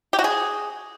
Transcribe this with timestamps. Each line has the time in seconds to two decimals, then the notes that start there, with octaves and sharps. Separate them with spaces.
0.13 G4
0.19 F#4
0.24 G#4